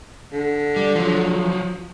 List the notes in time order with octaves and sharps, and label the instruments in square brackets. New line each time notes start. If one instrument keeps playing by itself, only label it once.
[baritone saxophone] D3
[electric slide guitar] G3
F3 F#3